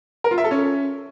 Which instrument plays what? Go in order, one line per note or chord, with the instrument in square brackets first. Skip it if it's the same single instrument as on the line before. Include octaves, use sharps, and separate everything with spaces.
[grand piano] A#4
F4
E5
A4
C#4